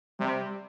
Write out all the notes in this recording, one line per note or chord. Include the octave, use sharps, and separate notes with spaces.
C3 G3